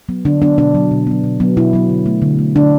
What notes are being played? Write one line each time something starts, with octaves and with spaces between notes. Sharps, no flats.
F#3 B3
D3 D4
F#3 B3 D4
B2 D4
F#3 B3
B2
F#3 B3
B2
F#3 B3
B2 E4
F#3 B3
D3
A3
D3
A3
D3 D4